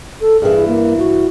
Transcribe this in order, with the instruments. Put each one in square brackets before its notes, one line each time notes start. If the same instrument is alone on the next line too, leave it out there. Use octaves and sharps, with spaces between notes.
[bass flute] A4
[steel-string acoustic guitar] G2 E3 [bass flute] G#4
[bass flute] A#3
F#4